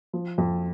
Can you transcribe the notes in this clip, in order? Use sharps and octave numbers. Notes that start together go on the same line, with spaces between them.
F3
F2